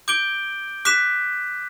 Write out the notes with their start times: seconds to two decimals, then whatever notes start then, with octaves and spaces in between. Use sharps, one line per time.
0.08 D6 G6 D7 G7
0.85 D6 F#6 B6 E7